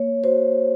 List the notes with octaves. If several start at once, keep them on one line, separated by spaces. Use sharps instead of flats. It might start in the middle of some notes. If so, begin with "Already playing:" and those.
Already playing: A#3 C#5
F#4 C5